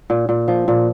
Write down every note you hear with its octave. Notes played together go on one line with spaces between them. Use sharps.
A#2
A#2
F3
A#2